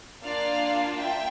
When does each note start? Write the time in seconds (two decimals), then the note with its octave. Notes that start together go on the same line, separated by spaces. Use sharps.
0.24 A#3 D4 F4 D5 F5
0.95 E5 G5